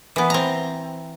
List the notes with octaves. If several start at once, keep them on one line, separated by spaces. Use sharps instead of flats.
E3 B3
C4 A#5